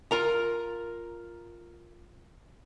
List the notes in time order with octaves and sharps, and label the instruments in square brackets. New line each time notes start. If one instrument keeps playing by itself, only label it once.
[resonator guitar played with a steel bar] F4 A#4 A#5